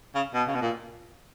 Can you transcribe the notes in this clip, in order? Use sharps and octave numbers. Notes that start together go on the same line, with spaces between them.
C#3
B2
C#3
B2
A#2